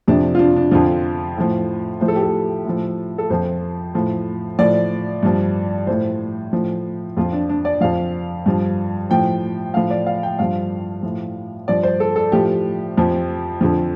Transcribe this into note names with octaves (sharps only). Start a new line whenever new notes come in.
F2 C3 F3 D4
F4
D4
D4
F2 D3 F3 F4
A2 F3
A2 F3 C5
A4
G4
A4
A2 F3
A4
F2 F3 C5
A2 F3
A2 F3 D5
G2 F3
A2 F3 C5
A2 F3
F2 F3 F4
D4
D4
D5
F2 F3 F5
G2 F3
A2 F3 G5
A2 F3 F5
D5
F5
G5
G2 F3 F5
A2 F3
G2 F3 D5
C5
A4
A4
A2 F3 G4
F2 F3
F2 D3 F3